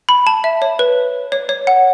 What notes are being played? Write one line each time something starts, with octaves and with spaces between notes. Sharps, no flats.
B5
A5
E5
C#5
B4
C#5
C#5
F#5